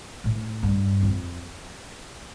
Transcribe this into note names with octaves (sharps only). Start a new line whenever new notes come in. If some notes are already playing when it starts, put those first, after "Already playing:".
A2
G2
F2